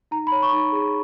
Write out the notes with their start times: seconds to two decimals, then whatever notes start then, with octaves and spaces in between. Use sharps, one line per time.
0.11 D#4 A#5
0.27 B5
0.32 C#5
0.42 C#6
0.52 D#4
0.72 G#4